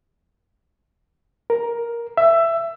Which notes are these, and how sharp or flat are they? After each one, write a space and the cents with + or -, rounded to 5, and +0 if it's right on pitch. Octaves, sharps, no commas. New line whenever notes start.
A#4 +10
E5 +15